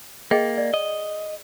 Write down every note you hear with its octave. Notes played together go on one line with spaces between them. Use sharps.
A#3 G#4 D#5 G5
D5
D#5